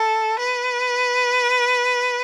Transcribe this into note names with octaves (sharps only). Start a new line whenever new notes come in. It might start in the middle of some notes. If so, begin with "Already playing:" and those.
Already playing: A4
B4